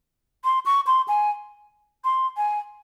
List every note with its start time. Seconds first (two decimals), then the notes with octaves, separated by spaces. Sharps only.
0.44 C6
0.66 C#6
0.87 C6
1.08 G#5
2.04 C6
2.37 G#5